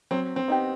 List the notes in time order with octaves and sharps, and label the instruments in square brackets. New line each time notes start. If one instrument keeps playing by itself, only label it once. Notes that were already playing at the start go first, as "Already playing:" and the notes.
[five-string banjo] F#3 [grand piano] C4
[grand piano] C4
[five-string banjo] B3 D#4 G4